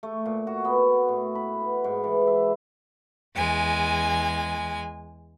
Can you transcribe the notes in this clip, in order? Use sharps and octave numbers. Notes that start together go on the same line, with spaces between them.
A3
A#2
F#4
B3
A2
B5
B3
G#2
E3
E5
E2 G#3 G#5